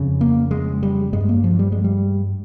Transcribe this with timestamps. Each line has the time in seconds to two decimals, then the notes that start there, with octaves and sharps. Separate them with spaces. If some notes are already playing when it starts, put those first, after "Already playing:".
Already playing: F2 C#3
0.21 A#3
0.51 G#3
0.83 G3
1.13 G2 G#3
1.29 A#3
1.44 F3
1.59 G3
1.72 G#3
1.84 G3